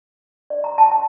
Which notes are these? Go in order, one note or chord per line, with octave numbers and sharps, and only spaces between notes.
D5
A#5
A5
A5